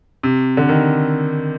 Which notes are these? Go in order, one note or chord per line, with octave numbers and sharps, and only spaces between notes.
C3
D3
D#3